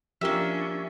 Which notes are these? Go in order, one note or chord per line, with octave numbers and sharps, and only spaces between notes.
F3 A#3 C#4 D4 G4 A#4 E5